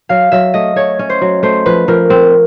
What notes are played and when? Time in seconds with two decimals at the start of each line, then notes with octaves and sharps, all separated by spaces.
0.09 F#3 F5
0.32 F#3 E5
0.54 A3 D#5
0.76 A3 C#5
0.99 C#4
1.10 C5
1.21 F#3
1.43 A3 C5
1.66 F3 B4
1.88 F3 A#4
2.10 C4